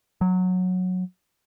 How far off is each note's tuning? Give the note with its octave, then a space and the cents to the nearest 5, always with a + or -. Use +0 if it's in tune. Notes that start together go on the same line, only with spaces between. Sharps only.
F#3 -15